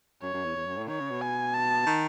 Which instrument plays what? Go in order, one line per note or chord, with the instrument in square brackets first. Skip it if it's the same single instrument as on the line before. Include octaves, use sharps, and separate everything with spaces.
[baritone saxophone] F#2 [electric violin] C#5
[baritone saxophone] F#2
E2
E2
F#2
A2
[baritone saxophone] D#3 [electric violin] C#5
[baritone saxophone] C#3
B2
[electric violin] G#5
A5
[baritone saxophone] D#3